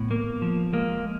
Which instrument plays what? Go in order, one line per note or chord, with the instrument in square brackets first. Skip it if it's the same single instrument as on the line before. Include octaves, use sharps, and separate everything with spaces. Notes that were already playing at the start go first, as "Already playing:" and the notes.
Already playing: [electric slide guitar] A2 B3
A#3
F3
G#3 A#3